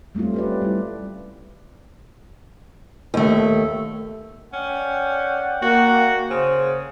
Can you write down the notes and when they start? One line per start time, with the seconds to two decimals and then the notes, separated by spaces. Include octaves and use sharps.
0.15 G3 A3 C4 C#4 F4
0.34 G4 B4 D5
0.62 G3 E4
3.14 D#2 A3
4.53 C#4 D5 F#5 G5
5.62 A#3 F#4
6.30 C#3 C5